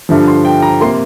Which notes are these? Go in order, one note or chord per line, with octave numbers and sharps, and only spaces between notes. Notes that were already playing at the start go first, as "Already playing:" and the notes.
G2 D3 F3
C6
G5
A#5
C3 A#3 C6